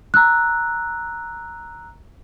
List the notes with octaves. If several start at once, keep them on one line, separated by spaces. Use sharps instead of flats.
A#5 E6 F#6